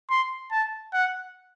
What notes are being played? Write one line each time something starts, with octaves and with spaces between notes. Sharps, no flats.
C6
A5
F#5